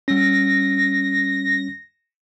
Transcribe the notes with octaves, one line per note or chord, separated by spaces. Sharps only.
G3 C#4 A#6